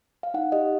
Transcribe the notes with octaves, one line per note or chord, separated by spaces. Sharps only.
F5
D#4 F#5
G4 D#5